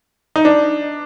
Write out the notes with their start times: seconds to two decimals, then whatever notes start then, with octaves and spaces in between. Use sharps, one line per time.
0.36 D#4
0.45 D4